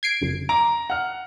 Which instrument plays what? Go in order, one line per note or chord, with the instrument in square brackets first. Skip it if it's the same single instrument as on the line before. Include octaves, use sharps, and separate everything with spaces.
[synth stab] G#6 C7 D7
G1 F#2
[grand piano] A#5 [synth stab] D6
[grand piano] F#5 F6